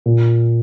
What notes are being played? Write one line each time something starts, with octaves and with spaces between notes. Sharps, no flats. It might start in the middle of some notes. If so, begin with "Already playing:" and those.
A#2